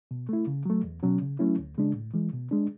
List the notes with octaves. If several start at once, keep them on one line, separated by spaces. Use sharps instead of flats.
B2
A3 E4
C#3
F#3 A3
E2
B2 F#3 C#4
C#3
F#3 A3 C#4 E4
D2
C#3 G#3 D4
A2
E3 G#3
B2
G#3 D4